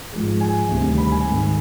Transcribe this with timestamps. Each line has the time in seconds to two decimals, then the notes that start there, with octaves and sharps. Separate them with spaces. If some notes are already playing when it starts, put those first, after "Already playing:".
0.12 G#2 F3 G#3
0.41 G#5
0.69 D2 C3 D#3 G3
0.98 B5
1.11 G#5
1.26 G#2 D#3 G#3